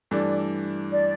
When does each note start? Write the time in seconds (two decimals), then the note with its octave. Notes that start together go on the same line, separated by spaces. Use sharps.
0.11 G2 E3 A3 D4 D5
0.91 D5